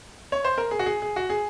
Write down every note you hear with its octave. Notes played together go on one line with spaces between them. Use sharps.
C#5
C5
A#4
G#4
F#4
G#4
G#4
F#4
G#4